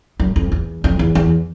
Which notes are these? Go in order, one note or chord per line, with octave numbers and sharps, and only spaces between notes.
F#2
F2
E2
F2
E2
E2